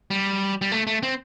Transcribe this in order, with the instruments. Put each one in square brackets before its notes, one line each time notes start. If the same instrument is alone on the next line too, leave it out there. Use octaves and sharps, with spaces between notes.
[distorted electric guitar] G3
G3
A3
A3
C4